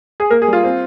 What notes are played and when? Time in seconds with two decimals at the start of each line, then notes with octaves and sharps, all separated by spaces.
0.20 G#4
0.30 A#3 A#4
0.42 G#4
0.47 G3
0.53 F4
0.64 C4